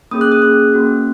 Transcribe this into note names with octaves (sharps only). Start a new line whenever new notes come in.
A#3 C#4 G#4 D#6
F#6
D#6
A#3 C#4 G#4 F#6
A#3 C#4 F#4